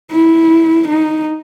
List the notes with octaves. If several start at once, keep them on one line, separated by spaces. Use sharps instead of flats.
E4
D#4